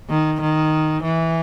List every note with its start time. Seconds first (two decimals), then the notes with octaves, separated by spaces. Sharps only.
0.09 D#3
0.41 D#3
1.03 E3